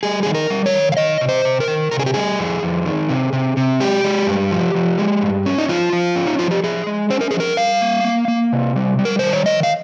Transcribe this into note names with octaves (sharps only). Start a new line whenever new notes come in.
G3 G#4
D#3 G#4
A#4
G3
C#5
D#3
F5
D#3 D#5
C3
C5
C3
A#4
D#3
C3 A#4
G#4
G4
G3 G#4
F2
F2
D#3
C3
C3
C3
G#3 G4
G#3
G2
F3
F3
G#3
G2
C#4
D#4
F3 F4
F3
C#4
D#4
F3 F4
G4
F3 G#4
G#3
C#4 C5
A#4
F3 G#4
A#4
G3 F5
A#3
A#3
A#3
C3
G3
G3
A#4
D#3 C5
C#5
D#3 D#5
F5